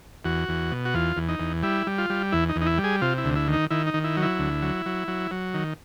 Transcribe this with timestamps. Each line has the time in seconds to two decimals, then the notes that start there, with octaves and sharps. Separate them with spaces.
0.25 E2 F#4
0.49 E2
0.72 B2
0.85 F#4
0.94 E2 F4
1.17 E2
1.29 D#4
1.40 E2
1.63 G3 E4
1.87 G3
1.98 F4
2.10 G3
2.32 E2 E4
2.49 D#4
2.56 E2
2.61 D#4
2.66 E4
2.78 G3
2.84 G#4
3.01 C3 F4
3.18 E4
3.24 D2
3.36 E4
3.48 D#3
3.53 D#4
3.70 D#3 E4
3.87 D#4
3.94 D#3
4.04 E4
4.17 F#3
4.22 E4
4.39 D2
4.62 F#3
4.86 F#3
5.08 F#3
5.31 F#3
5.54 D#3